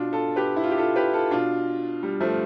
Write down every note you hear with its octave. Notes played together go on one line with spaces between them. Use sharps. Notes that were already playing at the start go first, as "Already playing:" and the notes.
Already playing: B2 D4 F4
F4 A4
G4 B4
E4
F4
G4
F4 A4
G4 B4
F4 A4
B2 D4 F4
G3
F3 A3